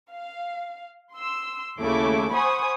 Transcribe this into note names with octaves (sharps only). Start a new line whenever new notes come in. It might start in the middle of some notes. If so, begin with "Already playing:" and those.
F5
C6 E6
D#2 C#3 A3 E4 D6
C5 F#5 G#5 B5 C#6 D#6